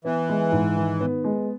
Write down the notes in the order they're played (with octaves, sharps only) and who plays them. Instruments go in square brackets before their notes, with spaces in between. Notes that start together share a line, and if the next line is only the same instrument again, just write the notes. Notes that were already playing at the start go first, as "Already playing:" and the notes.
[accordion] E3 [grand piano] B3
[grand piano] G#3
G#2
D#3
B3
G#3